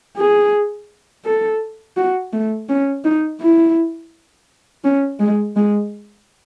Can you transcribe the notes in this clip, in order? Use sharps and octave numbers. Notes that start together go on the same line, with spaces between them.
G#4
A4
F#4
A3
C#4
D#4
E4
C#4
G#3
G#3